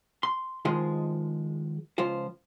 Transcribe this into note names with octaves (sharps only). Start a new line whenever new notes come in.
C6
D#3 F3 G#3 F4 G#4 C5
C#2 F3 F4 C5